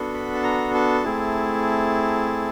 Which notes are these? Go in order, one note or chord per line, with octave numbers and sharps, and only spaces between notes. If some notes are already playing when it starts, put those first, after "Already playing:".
Already playing: B3 D4 F#4 A4
B5
A5
A#5
A5
A3 C4 E4 G#4